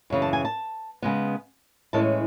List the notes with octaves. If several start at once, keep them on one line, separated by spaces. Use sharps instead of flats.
F#2 C#3 E3
A5
G#5
A5
C#3 G#3 B3
A2 E3 G#3 C#4 A5